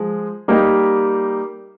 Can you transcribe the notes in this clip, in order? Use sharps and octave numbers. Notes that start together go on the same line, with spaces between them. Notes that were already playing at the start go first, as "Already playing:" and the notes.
Already playing: F3 G#3
G3 A#3 D#4 G4